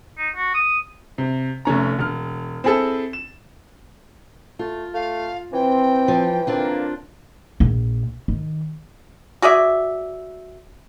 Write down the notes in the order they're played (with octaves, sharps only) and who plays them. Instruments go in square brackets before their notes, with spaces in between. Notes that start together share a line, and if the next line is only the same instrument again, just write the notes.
[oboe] D#4
F#4
D#6
[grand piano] C3
F1 A3 C#4 A#5
E1 F6
C4 E4 G#4 A4
E7
[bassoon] A3 [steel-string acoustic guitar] F4
[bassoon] A3 [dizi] F5
[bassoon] E3 [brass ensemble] C4 [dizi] G5
[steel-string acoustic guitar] F3
[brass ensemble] D3 A#3 [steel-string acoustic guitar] C4 D4 F4
[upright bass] A#1
D#3
[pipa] F#4 G#4 D5 E5